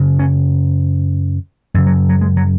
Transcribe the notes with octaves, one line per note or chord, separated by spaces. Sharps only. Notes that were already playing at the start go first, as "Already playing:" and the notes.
Already playing: F#2 C#3
C#4
F#2 C#3
F#3
F#3
G#3
F#3